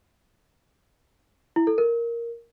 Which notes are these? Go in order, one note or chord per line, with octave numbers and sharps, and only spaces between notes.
E4
A4
A#4